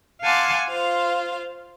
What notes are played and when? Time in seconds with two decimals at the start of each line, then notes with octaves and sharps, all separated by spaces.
0.21 F5 F#5 G#5 A5 C6 D6
0.67 F4 C5 F5